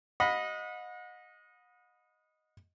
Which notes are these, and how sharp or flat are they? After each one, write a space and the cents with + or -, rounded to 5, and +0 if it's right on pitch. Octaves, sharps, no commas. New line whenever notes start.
D#5 +0 F#5 -40 B5 +0